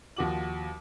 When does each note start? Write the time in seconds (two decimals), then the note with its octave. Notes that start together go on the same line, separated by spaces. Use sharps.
0.16 D#2 F3 F#4 D6 F#7